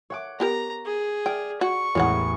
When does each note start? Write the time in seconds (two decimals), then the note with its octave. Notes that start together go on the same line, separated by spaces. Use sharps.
0.10 C#5 F#5 D6
0.40 B3 G4 A#4 A#5
0.86 G#4
1.26 D5 G5 F6
1.61 F#4 C#6
1.95 A1 E2 C#3 G#3 F#5